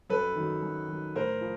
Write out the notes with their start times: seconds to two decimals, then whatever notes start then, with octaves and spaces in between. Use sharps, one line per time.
0.10 F#2 A4 B4
0.36 D#3 F#3
0.62 F#2
0.88 D#3 F#3
1.15 A2 A#4 C5
1.41 F3